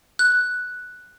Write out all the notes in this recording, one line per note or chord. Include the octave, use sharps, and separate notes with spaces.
F#6